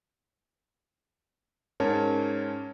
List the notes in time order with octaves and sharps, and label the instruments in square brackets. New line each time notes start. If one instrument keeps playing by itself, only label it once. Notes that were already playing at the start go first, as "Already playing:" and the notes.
[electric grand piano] G#2 C#4 A#4 C#5 A5